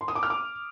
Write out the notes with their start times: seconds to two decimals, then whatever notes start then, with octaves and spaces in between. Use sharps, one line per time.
0.01 C6
0.08 D#6
0.15 D6
0.23 F6
0.30 D6